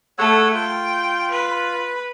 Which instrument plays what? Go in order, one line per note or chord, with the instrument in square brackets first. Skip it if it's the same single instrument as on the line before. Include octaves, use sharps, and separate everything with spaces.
[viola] A3 A4 [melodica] C#5 F#5 E6
[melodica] F4 [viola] G5
[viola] B4